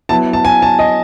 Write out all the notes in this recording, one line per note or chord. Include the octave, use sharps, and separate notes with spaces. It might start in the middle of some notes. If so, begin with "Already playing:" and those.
F#3 B3 E4 A5
A5
G#5
A5
D#5